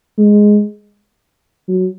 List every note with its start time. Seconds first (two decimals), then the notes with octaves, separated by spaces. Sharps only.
0.18 G#3
1.68 F#3